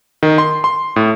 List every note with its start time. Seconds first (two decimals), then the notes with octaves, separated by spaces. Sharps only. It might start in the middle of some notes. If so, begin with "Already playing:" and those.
0.23 D#3
0.38 C6
0.64 C6
0.96 A2